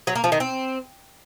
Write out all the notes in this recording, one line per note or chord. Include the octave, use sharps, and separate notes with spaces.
F#3
A#3
F3
D#3
C4